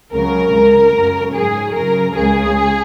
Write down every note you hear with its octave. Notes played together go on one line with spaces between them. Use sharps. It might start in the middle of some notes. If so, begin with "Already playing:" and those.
C#2 C#3 F#3 A#4
C#2 C#3 G#3
F#2 C#3 F#3
G#2 F#3 G#4
F#2 C#3 F#3 A#4
C#2 C#3 G#3 G#4